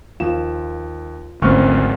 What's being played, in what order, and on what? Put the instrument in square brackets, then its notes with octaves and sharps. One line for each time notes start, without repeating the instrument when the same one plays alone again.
[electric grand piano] D#2 E7 [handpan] F4
[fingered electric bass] G#1 D#3 C#4 [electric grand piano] D2 C#6 F6 [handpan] A#3 C4